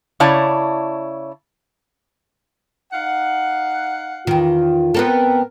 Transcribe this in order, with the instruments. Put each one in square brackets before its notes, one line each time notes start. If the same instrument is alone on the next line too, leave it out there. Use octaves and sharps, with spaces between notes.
[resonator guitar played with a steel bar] C#3 E4 C#5 D5 A5
[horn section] D#4 F5 F#5
[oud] E2 D#3 [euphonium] F4
[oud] B3 C4 A4 [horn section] A#4